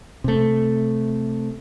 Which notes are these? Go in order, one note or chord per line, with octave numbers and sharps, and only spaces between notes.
C3 A3